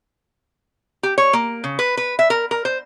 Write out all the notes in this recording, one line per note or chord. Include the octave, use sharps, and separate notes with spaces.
G4
C#5
A#3
C#3
B4
B4
E5
A#4
A#4
C5